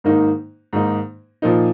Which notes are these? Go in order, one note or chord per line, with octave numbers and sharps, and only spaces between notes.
G#2 D#3 A#3 D#4
G#2 D#3 A#3 D#4
A#2 F3 A#3 D#4